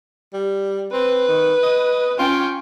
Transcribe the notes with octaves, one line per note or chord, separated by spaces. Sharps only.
G3
C4 B4
D#3
D#5
C#4 F4 G5